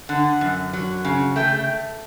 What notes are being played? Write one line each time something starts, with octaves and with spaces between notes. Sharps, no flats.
D3 F#5
F#2
F#3
C#3
A3 G5